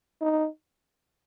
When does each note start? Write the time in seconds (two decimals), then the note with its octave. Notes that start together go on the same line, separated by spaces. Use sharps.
0.21 D#4